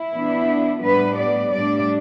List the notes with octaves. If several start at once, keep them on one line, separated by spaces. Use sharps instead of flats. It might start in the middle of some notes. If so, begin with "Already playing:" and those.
Already playing: E4
E3 B3 D4
A2 G3 B3 D4 B4
D5
A2 G3 D4 D5